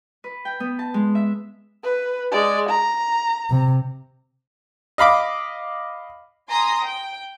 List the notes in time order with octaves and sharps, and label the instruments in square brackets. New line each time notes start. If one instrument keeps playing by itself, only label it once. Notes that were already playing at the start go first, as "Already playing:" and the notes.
[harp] B4
G5
B3
A5
G#3
E5
[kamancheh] B4
G#3 D5
A#5
[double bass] C3
[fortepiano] D#5 F5 B5 D6
[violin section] G#5 A#5 C6 D#6
G5